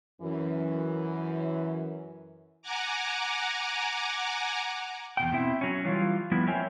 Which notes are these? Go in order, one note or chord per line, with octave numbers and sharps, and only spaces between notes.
F#2 E3
F#5 G#5 A#5 D6
E2 B2 G5
B2 C4 E4 E5
F#3 C#4
E3 G3 F4
F3 G3 B3 E4 B4
A#3 C4 C#5 E5 G5 G#5